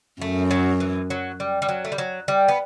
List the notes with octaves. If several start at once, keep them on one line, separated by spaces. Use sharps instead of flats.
F#2 A3
F#3
E3
F#3
G3
G3
F#3
A3
G3
F#3
G3
B3